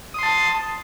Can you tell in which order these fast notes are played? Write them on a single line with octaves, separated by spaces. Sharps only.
D#6 C6 A5